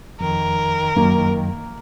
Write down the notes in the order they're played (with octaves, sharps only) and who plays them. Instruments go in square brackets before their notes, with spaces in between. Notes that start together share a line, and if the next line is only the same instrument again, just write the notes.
[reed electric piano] F2 [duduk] D#3 [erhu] A#4
[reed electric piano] F#2 [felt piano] A#3